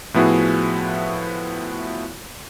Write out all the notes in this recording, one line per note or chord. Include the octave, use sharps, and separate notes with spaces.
A2 F3 B3 E4 F#4 G#4